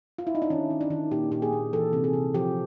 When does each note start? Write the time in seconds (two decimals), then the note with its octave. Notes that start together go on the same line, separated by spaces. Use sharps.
0.18 F4
0.27 E4
0.35 D#4
0.42 D4
0.50 D#3 C#4
0.70 D#3
0.81 D4
0.90 D#3
1.11 A#2 G4
1.31 A#2 G4
1.42 G#4
1.53 A#2
1.73 E3 A4
1.93 C3
2.04 G#4
2.13 C3
2.34 F3 G4